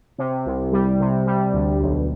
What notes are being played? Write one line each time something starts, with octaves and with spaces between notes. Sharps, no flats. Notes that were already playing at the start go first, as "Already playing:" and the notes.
C3
C2
G3
C3
G3
D2
B1